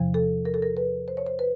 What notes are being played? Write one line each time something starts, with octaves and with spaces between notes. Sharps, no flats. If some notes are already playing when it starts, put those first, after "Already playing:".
Already playing: E2 C3 F3
A4
A#4
A4
A#4
B4
C5
C#5
C5
B4